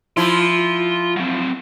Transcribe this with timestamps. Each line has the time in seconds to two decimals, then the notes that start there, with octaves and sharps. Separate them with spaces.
0.17 F3 E4 F4 C6
1.16 F#3 C4